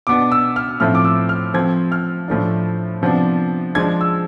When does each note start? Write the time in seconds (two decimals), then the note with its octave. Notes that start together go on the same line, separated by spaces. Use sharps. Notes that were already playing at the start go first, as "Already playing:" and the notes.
0.07 B2 B3 D4 D6
0.32 E6
0.56 F6
0.80 A2 F3 A3 C4 E4 F6
0.95 D6
1.05 E6
1.29 F6
1.54 F3 A3 C4 G#6
1.92 F6
2.28 A2 F3 A3 D4
3.02 C3 F3 B3 D4
3.75 F3 G#3 D4 G#6
4.01 E6